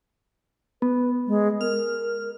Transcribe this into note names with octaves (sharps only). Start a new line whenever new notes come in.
B3 B4
G#3
A#4 F6